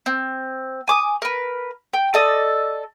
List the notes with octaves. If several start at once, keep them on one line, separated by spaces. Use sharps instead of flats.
C4
G#5 D6 D#6
A#4 B4
G5
A4 D5 D#5